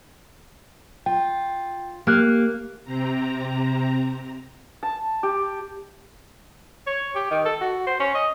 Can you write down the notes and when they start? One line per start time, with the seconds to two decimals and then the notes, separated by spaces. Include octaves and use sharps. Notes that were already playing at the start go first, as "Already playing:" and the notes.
1.06 F4 G5
2.07 A#3 G4 F6 F#6
2.85 C3 C4 A#5
4.83 A5
5.23 G4
6.87 C#5
7.15 G4
7.31 D#3
7.45 A4
7.61 F#4
7.87 C5
8.00 C#4
8.14 D#5